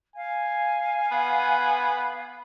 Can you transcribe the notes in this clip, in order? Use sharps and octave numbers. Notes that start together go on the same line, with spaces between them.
F5 G#5
B3